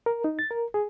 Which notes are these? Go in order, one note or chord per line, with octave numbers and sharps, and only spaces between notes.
A#4
D#4
A6
A#4
G#4